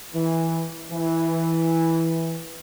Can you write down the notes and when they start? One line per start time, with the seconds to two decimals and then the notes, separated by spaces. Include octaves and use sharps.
0.15 E3
0.92 E3